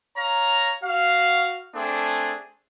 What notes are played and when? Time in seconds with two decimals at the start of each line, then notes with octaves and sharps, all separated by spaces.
0.16 C#5 F5 A#5
0.82 F#4 F5
1.75 A3 C4 D4 G#4